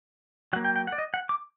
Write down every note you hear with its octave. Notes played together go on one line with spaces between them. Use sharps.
F#3 A#3 F#5
G5
G5
F#5
D5
D#5
F#5
D6